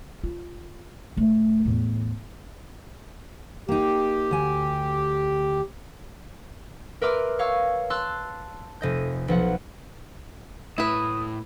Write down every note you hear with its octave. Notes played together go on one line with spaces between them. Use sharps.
F4
D#1 A3
E2 A2
A#3 D#4 G4
D2 G#5
A#4 B4 E5 C6 D6 F6
C#5 F5 C#6 E6
A5 C6 E6 F#6
F1 D#5 G6
B1 F3 F#5
A2 E4 B4 D#6